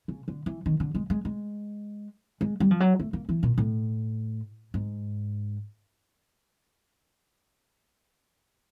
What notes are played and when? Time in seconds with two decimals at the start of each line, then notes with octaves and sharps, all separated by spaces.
0.08 C#3
0.28 D3
0.46 E3
0.66 D#3
0.80 D3
0.95 G#3
1.10 G#3
1.25 G#3
2.41 G#3
2.60 G3
2.71 F3
2.80 F#3
3.00 A3
3.13 A#3
3.29 E3
3.43 A#2
3.58 A2
4.74 G#2